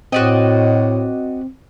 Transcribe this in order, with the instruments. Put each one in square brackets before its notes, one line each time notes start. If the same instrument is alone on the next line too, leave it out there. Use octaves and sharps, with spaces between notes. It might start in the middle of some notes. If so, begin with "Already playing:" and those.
[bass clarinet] A2 [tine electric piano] C4 [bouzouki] F#4 D5 D#5